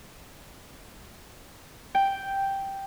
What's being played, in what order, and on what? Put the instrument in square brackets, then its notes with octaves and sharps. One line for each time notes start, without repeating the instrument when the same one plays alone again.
[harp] G5